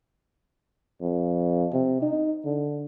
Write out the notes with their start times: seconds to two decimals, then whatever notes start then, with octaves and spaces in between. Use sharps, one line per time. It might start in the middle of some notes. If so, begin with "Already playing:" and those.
1.01 F2
1.72 C3
2.02 D#4
2.45 D3